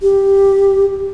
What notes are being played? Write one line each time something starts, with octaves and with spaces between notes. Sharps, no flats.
G4